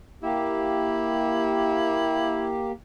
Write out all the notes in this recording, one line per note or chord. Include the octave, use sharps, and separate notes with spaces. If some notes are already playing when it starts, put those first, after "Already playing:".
A#3 E4 G4